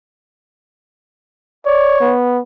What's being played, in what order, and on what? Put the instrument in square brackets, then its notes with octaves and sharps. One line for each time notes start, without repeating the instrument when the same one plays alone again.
[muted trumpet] C#5 [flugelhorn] D5
[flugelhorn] B3